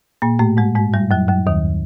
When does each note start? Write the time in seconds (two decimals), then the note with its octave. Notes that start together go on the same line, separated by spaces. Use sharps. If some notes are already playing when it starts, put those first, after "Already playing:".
0.22 A#2 A#3
0.39 A2 A3
0.57 G#2 G#3
0.75 G#2 G#3
0.93 G2 G3
1.11 F#2 F#3
1.28 F#2 F#3
1.47 D#2 D#3